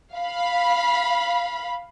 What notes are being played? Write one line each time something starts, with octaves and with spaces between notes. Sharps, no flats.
F5 B5